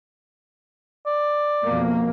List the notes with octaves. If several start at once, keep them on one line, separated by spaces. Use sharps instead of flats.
D5
F2 B2 A#3